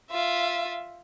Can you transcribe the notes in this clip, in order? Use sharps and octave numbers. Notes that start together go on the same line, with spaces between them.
F4 E5